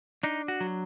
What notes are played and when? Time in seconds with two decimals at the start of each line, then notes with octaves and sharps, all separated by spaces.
0.23 D4 D#4
0.48 F#4
0.61 F#3